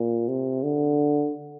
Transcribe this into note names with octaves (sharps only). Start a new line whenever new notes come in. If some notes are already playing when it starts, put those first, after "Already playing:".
Already playing: A#2
C3
D3